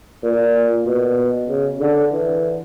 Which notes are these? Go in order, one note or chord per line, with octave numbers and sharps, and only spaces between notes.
A#2
B2
C#3
D3
E3